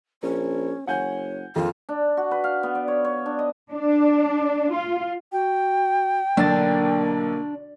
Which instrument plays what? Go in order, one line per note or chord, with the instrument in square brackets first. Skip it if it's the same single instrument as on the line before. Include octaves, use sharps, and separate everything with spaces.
[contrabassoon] A#1 [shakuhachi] C#4
[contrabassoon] F#1 [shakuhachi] C#5 [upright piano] F#5 G#5 G6
[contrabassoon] A#1 [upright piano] F2 [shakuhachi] F4
[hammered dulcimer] D4
F#4
B4
F5
B3
D5
C#5
C#5
D4
D#5
[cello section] D4
F4
[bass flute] F#4 [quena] G5
[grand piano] B1 D3 A6 [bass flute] A#3 [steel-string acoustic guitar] D4